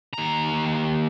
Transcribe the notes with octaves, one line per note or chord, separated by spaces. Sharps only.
D#2 A#5